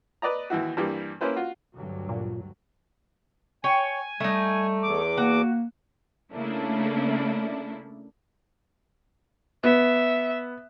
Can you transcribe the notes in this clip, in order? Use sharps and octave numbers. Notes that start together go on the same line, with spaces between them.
B4 D5 D#5 A#5
D#2 E3 E4 F#4
G2 E3 G3 A#3 G4
A#3 C#4 E4 B4 C5
F4 F#4
D2 G2 F#3
A#2
C#5 G5 G#5
G3 A3 D#4
E2 D6
A#3 F#4
C#3 A3 A#3 D4 E4
B3 E5